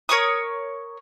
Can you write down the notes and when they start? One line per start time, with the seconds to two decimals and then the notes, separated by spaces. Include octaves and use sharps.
0.09 A#4 C#5 C#6 D#6